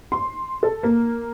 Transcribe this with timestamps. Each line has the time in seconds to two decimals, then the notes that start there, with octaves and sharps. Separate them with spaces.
0.12 C6
0.63 A4
0.83 A#3